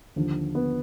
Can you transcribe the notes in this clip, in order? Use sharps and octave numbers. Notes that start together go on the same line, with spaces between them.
D#2 D3 F3
B3